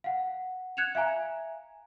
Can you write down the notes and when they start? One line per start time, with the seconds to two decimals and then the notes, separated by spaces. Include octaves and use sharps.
0.04 F5 F#5
0.77 F#6 G#6 C#7 E7 F7
0.95 E5 F5 G#5 A#5